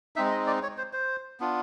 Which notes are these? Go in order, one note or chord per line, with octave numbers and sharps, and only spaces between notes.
G#3 C4 D#4 E5
D#5
D5
C#5
C5
C5
B3 D4 F4